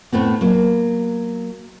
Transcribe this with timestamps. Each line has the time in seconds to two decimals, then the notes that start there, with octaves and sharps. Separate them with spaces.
0.12 A2 A3 B3 C4
0.41 F#3 A#3